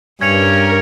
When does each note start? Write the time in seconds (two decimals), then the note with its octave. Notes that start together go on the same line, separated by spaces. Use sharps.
0.21 G2 C#4 A#4 G#6 C#7 F7